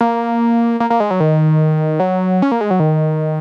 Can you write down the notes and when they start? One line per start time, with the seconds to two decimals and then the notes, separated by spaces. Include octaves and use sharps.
0.01 A#3
0.80 A#3
0.90 A#3
1.00 G#3
1.11 F#3
1.20 D#3
2.00 F#3
2.42 C#4
2.52 A#3
2.61 G#3
2.70 F#3
2.80 D#3